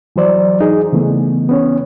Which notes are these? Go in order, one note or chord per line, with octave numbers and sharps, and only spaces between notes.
E3 F#3 C5 D5
D#4 G#4
C#3 E3 A3 B3
B3 C#4 C#5